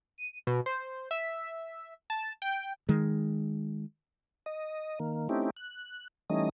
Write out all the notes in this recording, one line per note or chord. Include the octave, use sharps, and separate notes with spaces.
D#7
B2
C5
E5
A5
G5
D#3 G#3
D#5
D#3 A#3
A3 C4 C#4 D#4 E4 G4
F#6
E3 G3 A3 C#4 D#4 D#5